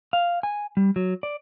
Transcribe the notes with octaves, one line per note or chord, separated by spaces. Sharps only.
F5
G#5
G3
F#3
D5